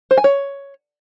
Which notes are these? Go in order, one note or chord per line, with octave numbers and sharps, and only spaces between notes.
C5
G#5
C#5